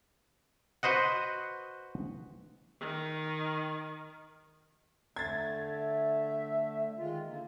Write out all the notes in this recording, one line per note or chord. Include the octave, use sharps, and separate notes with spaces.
F#4 B4 C5 D#5 F#5
D#3
D3 A3 G#6 A6
E5
D#3 G#3 F4
D3 A#3